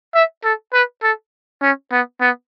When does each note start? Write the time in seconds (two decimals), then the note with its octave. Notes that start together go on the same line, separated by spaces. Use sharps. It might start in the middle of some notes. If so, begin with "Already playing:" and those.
0.14 E5
0.44 A4
0.73 B4
1.03 A4
1.62 C#4
1.92 B3
2.21 B3